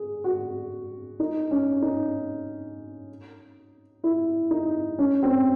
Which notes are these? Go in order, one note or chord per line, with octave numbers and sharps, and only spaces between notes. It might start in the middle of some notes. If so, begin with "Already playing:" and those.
Already playing: G#4
F#4
D#4
C#4
D#4
E4
D#4
C#4
C4